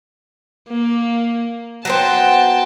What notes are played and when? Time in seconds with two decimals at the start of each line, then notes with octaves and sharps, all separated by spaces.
0.69 A#3
1.85 F#3 B3 C5 G5 A5